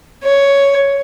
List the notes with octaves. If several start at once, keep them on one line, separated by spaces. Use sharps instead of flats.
C#5